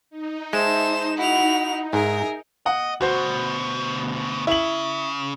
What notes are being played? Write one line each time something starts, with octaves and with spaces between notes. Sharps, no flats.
D#4
G#3 C5 E5 A5 E7
E4 F#4 F#5 F7
G#2 G#4 A#4 E5
D#5 F#5
D2 B2 F#4 C5
C#3 E4 F#7